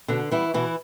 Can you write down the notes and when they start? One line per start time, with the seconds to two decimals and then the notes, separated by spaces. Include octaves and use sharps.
0.08 B2 D3 D4
0.31 E3 G3 B3 E4
0.54 B2 E3 E4